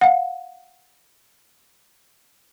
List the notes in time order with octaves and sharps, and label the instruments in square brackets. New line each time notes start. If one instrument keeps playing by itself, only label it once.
[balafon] F5 F#5